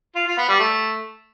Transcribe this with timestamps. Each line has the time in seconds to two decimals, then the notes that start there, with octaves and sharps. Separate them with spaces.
0.16 F4
0.27 F4
0.38 B3
0.49 G3
0.60 A3